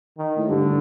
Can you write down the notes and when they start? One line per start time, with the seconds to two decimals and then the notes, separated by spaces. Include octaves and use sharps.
0.18 D#3
0.37 A2
0.49 G2 D3